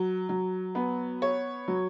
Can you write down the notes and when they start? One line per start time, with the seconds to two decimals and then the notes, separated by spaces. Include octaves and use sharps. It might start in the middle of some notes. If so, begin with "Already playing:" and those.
Already playing: F#3
0.29 F#3
0.75 B3
1.22 C#5
1.68 F#3